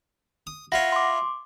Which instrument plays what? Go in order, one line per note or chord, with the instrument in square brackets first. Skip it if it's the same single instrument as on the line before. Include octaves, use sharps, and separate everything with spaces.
[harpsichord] D#6
[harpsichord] E4 F4 C#5 [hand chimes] F#5 A#6
[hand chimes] C6 D6